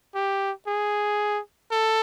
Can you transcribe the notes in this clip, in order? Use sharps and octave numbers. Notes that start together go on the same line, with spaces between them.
G4
G#4
A4